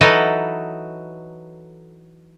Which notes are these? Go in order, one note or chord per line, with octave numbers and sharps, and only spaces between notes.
E3 F#3 D#4 A4 B4 D#5